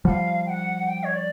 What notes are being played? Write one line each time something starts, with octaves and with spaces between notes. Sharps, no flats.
F3 G3 F5 F#5
G5
F#5
G5
C#5
D5